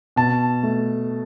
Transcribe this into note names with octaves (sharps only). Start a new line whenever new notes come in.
B2 A5
A3